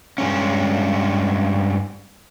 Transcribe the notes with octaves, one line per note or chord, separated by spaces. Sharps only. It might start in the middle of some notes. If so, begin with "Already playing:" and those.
G2 G#3 C#4